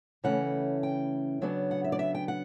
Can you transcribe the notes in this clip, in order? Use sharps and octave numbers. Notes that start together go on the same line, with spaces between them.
C#3 E3 A3 C#4 F#5
G5
C#3 F#3 B3 D4
F#5
E5
D5
E5
G5
F#5